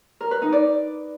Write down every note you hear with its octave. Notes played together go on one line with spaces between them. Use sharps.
A#4
B4
D#4
D5